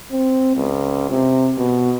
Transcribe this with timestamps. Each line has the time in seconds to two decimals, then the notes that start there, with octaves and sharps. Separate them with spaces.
0.11 C4
0.56 C#2
1.10 C3
1.57 B2